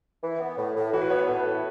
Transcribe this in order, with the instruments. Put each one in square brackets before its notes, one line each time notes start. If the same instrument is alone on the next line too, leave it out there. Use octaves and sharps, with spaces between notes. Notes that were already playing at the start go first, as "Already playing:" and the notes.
[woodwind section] E3
B3
A2
A2
[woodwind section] E3 [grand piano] F#4
[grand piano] B4
[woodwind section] B3 [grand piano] C#5
[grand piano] B4
[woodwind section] A2 [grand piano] A4
[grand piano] B4
[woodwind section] A2